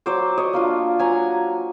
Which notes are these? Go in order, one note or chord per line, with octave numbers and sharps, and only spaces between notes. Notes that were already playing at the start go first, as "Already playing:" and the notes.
F#3 C5 D5
C#5 D#5
A#3 D4 F4
F#3 G#5 A#5